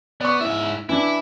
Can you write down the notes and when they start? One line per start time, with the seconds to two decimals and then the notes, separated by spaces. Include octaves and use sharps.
0.21 B3 D5 C#6
0.41 G#2 E4 E5
0.89 E3 D4 E4